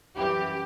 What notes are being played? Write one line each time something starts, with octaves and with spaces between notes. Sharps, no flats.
F#2 E3 G3 G4